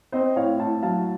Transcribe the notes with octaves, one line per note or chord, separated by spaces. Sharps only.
C4 C5 D#5
A2 C#5 F5
A2 F5 A5
F#3 F5 A5